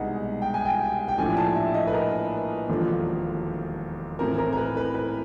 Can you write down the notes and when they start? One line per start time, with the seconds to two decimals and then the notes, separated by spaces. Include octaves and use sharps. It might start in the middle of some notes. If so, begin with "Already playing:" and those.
Already playing: C2 B2 G#3 B3 D#4 F#5
0.42 G5
0.54 G#5
0.65 G5
1.08 G5
1.18 A#1 A2 F3 A3 D4 G#5
1.37 A5
1.55 E5
1.74 D#5
1.87 B4
1.93 A#4
2.69 E1 D#2 D3 F3 A3
4.19 A2 E3 A3 C4 A#4
4.38 A#4
4.53 A#4
4.57 B4
4.77 B4
4.95 B4